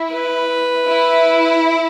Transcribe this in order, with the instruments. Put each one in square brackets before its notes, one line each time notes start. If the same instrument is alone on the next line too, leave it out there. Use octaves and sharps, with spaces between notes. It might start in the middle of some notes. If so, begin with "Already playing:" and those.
Already playing: [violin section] E4
[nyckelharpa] B4
[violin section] E4